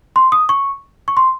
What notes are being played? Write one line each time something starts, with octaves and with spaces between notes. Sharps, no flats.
C6
D#6
C#6
C#6
C6